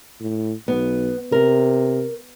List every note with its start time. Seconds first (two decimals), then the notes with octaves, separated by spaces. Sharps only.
0.20 A2
0.68 B1 B3
1.32 C3 A#4